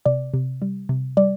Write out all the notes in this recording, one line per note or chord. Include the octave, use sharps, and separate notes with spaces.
C3 D5
C3
G3
C3
G3 D5